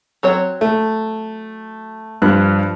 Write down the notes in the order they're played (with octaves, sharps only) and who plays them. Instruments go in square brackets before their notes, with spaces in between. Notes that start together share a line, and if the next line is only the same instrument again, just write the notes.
[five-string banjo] F#3 C4 C#5
[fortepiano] A3
[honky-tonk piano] G2 [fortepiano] F3 F#6